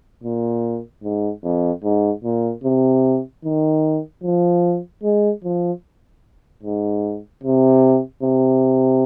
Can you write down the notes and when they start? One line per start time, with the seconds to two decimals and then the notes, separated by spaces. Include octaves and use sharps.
0.24 A#2
1.03 G#2
1.44 F2
1.84 G#2
2.24 A#2
2.64 C3
3.44 D#3
4.24 F3
5.03 G#3
5.44 F3
6.63 G#2
7.43 C3
8.23 C3